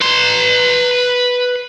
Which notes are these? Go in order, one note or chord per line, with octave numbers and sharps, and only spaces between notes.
B4 C6